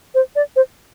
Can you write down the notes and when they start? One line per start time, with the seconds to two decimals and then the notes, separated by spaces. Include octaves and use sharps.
0.15 C5
0.36 D5
0.56 C5